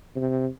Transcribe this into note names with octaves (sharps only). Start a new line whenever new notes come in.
C3